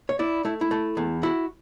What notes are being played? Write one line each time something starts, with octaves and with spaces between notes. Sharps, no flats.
C#5
E4 D5
A3 E4
E4
A3
E2
E4 F#4